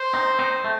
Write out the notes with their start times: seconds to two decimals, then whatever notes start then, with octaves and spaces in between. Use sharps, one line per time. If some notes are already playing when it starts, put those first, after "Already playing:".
Already playing: C5
0.14 C4 D#4
0.39 C4 D#4
0.64 A3